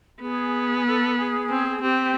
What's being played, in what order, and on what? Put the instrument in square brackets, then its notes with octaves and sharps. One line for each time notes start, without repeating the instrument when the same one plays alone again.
[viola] B3 [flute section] G#4
[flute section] A4
G#4
[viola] C4
[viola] C4 [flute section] G4